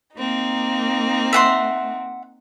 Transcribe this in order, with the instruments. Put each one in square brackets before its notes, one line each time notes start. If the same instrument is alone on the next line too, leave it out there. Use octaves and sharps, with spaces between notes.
[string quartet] A#3 C4 D#4
[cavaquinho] E5 F#5 C6